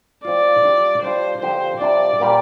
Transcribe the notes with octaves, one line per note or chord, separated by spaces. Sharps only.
F3 C4 F4 D5
G3 D4 F4
G3 D4 F4 C5
D3 F3 C4 G4 C5
C3 G3 D4 F4 D5
A#2 G3 A#3 G4